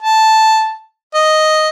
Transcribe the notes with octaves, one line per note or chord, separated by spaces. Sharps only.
A5
D#5